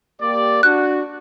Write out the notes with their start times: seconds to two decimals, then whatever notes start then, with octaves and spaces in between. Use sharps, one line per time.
0.21 A#3 G4 D5
0.63 D4 F#4 F#6